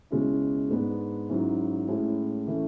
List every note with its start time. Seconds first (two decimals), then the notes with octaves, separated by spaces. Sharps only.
0.11 C#2 B2 G#3 C#4 E4
0.70 G#2 G#3 B3 D4
1.29 G#2 F#3 C#4 E4
1.88 A2 G#3 C#4 E4
2.47 E3 A3 C#4